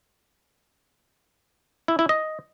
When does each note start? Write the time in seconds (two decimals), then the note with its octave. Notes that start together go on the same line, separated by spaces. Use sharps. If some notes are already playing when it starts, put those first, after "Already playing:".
1.88 E4
1.99 E4
2.09 D#5